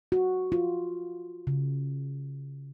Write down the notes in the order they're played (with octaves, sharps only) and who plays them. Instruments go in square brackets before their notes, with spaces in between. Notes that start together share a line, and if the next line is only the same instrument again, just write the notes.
[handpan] F#4
F4
C#3